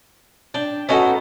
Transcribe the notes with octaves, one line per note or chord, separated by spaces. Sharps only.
D4 G5
B3 C#4 D#4 F#4 A4 F#5